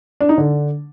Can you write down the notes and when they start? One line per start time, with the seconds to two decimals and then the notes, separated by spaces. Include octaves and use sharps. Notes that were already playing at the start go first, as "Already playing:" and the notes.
0.21 D4
0.29 D#4
0.38 D3